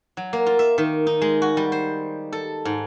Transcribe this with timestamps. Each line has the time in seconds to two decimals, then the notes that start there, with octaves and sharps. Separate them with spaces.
0.17 F#3
0.33 A#3
0.46 F4
0.59 E5
0.78 D#3
1.07 D#4
1.21 G#3
1.42 F#4
1.57 G3
1.72 C5
2.32 A4
2.65 G#2